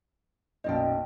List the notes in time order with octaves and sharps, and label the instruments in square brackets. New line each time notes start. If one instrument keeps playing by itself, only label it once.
[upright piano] B1 F#2 A#2 [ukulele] C5 D5 G5 [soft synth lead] D#5